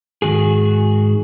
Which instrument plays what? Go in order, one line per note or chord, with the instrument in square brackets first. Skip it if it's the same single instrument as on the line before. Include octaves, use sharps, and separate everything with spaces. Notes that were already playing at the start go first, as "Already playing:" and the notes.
[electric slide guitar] G#2 D#3 F#4 G#4